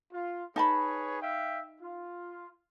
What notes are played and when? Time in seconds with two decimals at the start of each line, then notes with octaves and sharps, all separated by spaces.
0.13 F4
0.56 D#4 G#4 B4 C#5 A5 B5
1.22 E5 F5 G5
1.81 F4